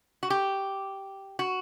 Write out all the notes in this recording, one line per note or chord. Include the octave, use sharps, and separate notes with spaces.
F#4
G4
F#4